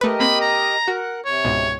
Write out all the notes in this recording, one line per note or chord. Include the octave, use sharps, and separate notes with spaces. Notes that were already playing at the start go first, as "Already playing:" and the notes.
A3 G4 A#4 B4 D#5
A#3 C4 B5
A#5
F#4 A#4 F#5
C3 C#5
C#2 G#2 B2